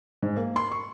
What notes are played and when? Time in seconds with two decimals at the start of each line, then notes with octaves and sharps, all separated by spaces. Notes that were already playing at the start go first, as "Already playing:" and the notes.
0.22 G#2
0.36 A#3
0.56 C6
0.71 C#6